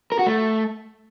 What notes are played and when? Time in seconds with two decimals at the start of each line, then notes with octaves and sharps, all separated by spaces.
0.12 A#4
0.19 F#4
0.26 A3